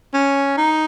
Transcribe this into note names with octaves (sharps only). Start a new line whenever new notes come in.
C#4
D#4